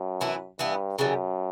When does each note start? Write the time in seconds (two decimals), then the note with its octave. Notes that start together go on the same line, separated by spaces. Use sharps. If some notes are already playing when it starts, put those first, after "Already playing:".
Already playing: F#2
0.21 E3 B3 E4
0.59 G2 E3 B3 E4
0.99 F#2 C#3 E3 G3